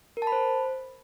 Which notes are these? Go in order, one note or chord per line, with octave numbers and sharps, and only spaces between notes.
A#4
A5
B5
C5